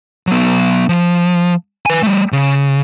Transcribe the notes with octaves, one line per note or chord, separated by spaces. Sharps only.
F#3 B3
F3
B4 G#5
G3 A3
C#3